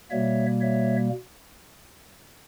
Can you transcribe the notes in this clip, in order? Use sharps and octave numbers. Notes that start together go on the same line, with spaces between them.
B2 G3 A#3 C#5 E5
C#5 E5